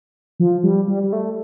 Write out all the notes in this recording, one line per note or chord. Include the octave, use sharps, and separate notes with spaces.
F3
G3
G3
G3
A3